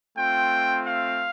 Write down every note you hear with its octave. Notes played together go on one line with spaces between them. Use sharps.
A3 C4 F4 G5
F5